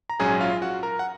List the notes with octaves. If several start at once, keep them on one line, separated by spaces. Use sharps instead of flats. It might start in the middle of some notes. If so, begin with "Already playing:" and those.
A#5
A#1 G#2 F#3 C#4 G#4 G#5
F4 F5
F#4 F#5
A#4 A#5
F#5